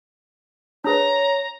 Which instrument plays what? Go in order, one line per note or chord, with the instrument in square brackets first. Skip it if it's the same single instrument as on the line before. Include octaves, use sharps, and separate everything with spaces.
[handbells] D4 G#4 B4 [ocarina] C#5 [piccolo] A#5